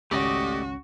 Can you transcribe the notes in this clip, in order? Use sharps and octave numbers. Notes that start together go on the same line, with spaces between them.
G#1 C#2 A3 C#4 F#4 G4 D5 D#5